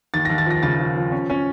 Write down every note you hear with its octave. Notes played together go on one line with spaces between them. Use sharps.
D#2 A6
A#6
D#2
A6
F3 A#6
C#3 A6
F3
F3
C#4
C#4